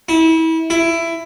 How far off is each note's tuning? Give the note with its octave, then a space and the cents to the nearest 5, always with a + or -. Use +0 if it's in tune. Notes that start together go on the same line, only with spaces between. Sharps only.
E4 -30
E4 +15